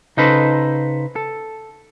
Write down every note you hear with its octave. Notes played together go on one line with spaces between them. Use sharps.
C#3 D#4 A4 B4 C5
A4